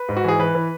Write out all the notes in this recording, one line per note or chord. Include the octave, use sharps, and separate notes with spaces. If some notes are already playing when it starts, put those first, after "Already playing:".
Already playing: B4
G#2
F#4
E3 G#4
E3 B4
E3